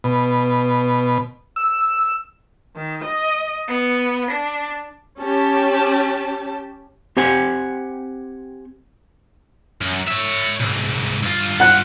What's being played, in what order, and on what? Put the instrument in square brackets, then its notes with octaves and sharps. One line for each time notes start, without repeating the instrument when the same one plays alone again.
[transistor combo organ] B2
E6
[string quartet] D#3
D#5
B3
D4
[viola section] C#4 G4 A5
[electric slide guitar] C4 G4 C5 F#5 G#5
[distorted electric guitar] F#2
C#5 E5
C2 G#2
G2 F4
[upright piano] F#5 F#6